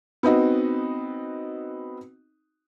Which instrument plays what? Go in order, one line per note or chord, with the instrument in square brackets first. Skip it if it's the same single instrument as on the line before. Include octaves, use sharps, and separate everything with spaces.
[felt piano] B3 C4 D#4 F#4